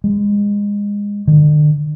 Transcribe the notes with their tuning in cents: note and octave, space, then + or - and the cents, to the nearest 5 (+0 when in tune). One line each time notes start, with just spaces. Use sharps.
G#3 -25
D3 +40